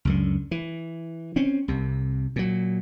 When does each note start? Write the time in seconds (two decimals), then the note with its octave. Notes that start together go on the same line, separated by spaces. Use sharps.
0.05 C#2 F#2 D3
0.51 E3
1.36 C4 C#4
1.68 C2 C3
2.36 A#2 F#3